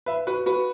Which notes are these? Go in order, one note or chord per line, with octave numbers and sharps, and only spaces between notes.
B4 E5
F#4 B4
F#4 B4